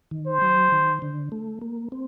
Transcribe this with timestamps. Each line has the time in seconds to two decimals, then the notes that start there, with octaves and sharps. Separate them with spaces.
0.11 D#3
0.26 C5
0.42 F#3
0.72 D#3
1.02 D3
1.32 A3
1.61 A#3
1.92 C4